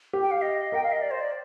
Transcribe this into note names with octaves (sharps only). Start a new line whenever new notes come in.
G4
G5
F5
D#5
A#4 G5
F5
D#5
D5
C5
D5